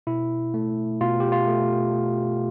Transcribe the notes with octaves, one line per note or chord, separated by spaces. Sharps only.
B2 E4
A3
B2 F4
G4
F4
A3